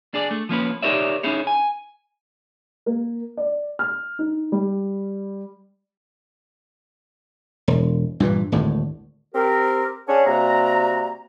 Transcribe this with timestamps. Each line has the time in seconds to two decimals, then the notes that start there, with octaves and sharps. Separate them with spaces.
0.14 D4 G#4 D5
0.31 A3
0.49 F3 A#3 C#4 B4
0.82 D#4 G4 A#4 C#5 D5 E5
1.23 C#4 D#4 E4 G#4 C#5
1.47 G#5
2.86 A#3
3.37 D5
3.79 F6
4.19 D#4
4.52 G3
7.68 E1
8.20 G2 A#2 D#3 E3
8.52 G#1 D2 A2
9.35 C4 G4 A#4
10.08 C#4 D4 G#4 C#5 F#5 A5
10.26 C3 G3 A#3 F#4 A#5